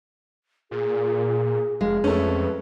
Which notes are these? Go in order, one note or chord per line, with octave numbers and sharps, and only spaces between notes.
A#2 G#4
F1 G#3 F5
F2 A3 C#4 B4